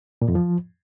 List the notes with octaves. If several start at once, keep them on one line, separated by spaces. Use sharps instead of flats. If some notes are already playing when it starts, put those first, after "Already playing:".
A#2
F2
F3